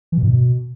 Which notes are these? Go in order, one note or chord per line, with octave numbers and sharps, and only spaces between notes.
E3
B2
G2
B2